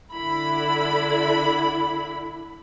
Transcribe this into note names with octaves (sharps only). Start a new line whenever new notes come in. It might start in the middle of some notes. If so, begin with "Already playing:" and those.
D3 E4 B5